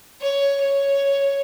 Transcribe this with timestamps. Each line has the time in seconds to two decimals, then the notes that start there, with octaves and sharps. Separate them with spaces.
0.21 C#5
0.60 C#5